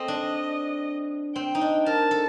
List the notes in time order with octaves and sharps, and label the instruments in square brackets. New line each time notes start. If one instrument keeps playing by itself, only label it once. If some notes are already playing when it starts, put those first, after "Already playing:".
Already playing: [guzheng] C4 A4 [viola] D#5
[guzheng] D4
[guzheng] C4 [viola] G5
[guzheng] D#4
D4
[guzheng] A#4 [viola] A5
[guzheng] A4